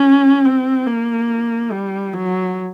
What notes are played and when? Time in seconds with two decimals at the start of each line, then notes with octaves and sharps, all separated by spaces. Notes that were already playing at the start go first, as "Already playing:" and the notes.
Already playing: C#4
0.45 C4
0.87 A#3
1.72 G3
2.13 F#3